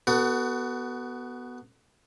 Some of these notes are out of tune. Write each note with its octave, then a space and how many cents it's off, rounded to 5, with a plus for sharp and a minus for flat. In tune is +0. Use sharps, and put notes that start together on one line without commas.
B3 +0 F#4 +25 A4 +30